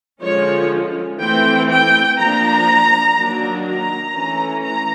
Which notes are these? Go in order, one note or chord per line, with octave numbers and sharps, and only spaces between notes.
D3 F3 G#3 C#4 C#5
E3 A3 C4 G5
G5
F3 A#3 D4 A#5
D#3 F#3 A#3 D4
A#5
E3 A3 C#4
A#5